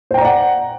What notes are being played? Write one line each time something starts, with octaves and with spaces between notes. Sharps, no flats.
C5 D5 F#5 G5 A#5